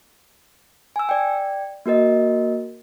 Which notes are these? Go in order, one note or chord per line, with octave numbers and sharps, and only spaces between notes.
G#5 E6
D5 G5
A#3 F#4 A#4 D#5